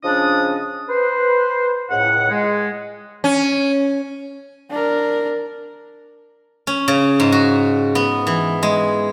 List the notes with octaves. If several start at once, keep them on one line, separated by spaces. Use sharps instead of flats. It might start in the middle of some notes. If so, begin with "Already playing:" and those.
C#3 F3 C#4 D4 D#5 D#6
B4 C5
C#2 A2 F#5
G#3
C#4
D4 A#4
C#4
C#3
G#2
F#4
B3
E3
G#3